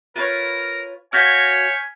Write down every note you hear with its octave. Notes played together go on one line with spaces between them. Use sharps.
F4 A#4 B4 C#5
F#4 C#5 F5 G#5 F6 G6 B6